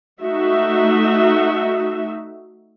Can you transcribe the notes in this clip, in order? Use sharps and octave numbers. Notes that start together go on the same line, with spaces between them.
A3 D#4 F#4 E5